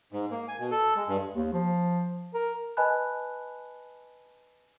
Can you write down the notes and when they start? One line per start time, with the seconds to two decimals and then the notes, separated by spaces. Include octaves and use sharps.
0.13 G#2
0.31 A#3
0.48 G#5
0.59 B2
0.71 A4
0.96 G#3
1.08 G2
1.36 D#2
1.53 F3
2.34 A#4
2.77 B4 D#5 G#5 A5 B5 F#6